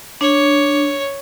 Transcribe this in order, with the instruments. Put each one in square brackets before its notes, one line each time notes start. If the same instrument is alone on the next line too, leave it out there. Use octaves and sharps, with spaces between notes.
[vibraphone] D4 [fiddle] C#5